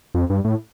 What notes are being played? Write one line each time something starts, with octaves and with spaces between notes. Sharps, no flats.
F2
G2
A2